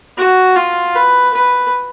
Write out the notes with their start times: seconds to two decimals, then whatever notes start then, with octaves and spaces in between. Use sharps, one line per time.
0.17 F#4
0.56 F4
0.95 B4
1.34 B4